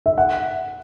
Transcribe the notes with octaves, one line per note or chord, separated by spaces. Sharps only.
E5
F#5